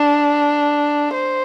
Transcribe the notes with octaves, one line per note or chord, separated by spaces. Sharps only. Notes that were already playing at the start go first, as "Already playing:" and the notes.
Already playing: D4
C5